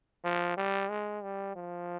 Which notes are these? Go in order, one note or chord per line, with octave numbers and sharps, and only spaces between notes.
F3
G3
G#3
G3
F3